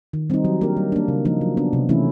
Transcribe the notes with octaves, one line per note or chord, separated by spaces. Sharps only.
D#3
G3 C4 D#4
F#3
A#3 D4 G4 A#4
G3
A#3 D4
C#3
F3 A#3 D#4
F#3
B3 D4
C3
E3 A3 C#4 E4